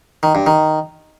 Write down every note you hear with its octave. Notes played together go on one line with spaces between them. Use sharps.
D#3
G2
D#3